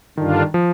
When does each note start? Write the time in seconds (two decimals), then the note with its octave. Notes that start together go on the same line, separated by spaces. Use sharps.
0.17 G2 D3 D#3 G3 D4 F4
0.54 F3